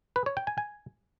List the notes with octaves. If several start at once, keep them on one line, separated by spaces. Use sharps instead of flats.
B4
C#5
G5
G#5
G#5